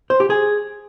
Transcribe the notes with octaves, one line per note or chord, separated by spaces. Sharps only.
C5
G4
G#4